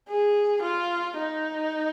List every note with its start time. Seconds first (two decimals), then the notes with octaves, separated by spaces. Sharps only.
0.09 G#4
0.63 F4
1.17 D#4